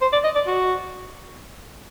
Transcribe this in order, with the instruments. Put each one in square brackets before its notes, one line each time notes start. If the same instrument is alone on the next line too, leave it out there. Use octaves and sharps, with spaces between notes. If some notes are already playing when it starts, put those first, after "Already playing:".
[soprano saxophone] C5
D5
D#5
D5
F#4